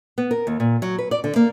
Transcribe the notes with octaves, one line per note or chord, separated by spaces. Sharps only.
B3
A#4
D#2
A#2
F#3
B4
D5
D3
A#3